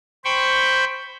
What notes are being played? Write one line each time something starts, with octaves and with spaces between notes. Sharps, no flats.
C5 G5 B5 C#6